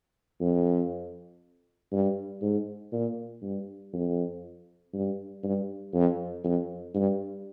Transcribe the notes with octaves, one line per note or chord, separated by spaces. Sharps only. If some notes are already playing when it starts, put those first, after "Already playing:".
F2
G2
G#2
A#2
G2
F2
G2
G2
F2
F2
G2